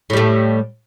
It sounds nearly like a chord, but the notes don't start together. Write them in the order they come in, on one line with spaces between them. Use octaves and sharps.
A2 G3 A3